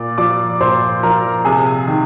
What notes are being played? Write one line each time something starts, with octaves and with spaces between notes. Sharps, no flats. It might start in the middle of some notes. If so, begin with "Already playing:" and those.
Already playing: A#2 D5 D6
F3 D5 D6
A#2 C5 C6
F3 A#4 A#5
C3 G#4 G#5
D#3